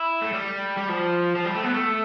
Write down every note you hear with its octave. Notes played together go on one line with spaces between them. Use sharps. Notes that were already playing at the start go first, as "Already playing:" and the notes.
Already playing: E4
A3
G3
G3
F3
F3
G3
A3
B3
A3